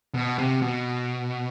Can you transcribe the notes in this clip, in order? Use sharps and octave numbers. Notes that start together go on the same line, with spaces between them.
B2
C3
B2